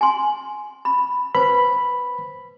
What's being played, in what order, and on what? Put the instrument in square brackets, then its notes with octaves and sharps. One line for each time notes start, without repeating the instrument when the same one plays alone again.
[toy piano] G#5 C6
B5
[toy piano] B4 C5 [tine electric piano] B5